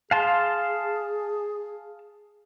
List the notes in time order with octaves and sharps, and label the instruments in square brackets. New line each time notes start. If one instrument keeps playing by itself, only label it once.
[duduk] G#4 [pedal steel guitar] F5 A5 C6